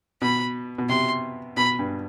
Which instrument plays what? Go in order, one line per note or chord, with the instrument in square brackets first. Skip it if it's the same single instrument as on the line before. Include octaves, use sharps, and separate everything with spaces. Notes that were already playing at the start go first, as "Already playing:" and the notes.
[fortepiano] B2 [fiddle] B5
[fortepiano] B2
[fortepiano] C3 [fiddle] C6
[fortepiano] B2 [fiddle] B5
[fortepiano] G2